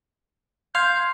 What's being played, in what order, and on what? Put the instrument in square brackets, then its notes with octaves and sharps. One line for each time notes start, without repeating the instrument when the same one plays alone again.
[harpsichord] F5 [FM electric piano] C6 G#6 C7 [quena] G6